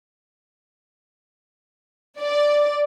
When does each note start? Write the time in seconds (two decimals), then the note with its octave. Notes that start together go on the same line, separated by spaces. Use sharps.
2.20 D5